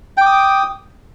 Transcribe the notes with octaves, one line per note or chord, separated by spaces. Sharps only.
G5 D6 D#6